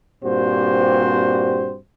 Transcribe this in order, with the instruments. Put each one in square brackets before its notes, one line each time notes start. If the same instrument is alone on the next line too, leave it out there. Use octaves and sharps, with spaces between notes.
[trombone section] G2 A#2 C4 F#4 G4 C5